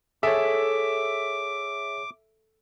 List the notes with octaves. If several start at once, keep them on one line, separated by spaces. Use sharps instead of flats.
G#4 A4 C#5 E5 D6